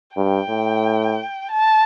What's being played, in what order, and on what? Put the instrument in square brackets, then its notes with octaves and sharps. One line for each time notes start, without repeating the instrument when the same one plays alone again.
[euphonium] G2 [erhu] G5
[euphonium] A2
[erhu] A5